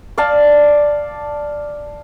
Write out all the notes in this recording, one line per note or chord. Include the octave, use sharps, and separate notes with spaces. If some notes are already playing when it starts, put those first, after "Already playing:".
D5 F5 A5